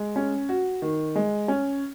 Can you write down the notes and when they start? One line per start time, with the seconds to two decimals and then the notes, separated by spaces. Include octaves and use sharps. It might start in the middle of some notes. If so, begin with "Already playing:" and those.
Already playing: G#3
0.16 C#4
0.49 F#4
0.82 D#3
1.15 G#3
1.48 C#4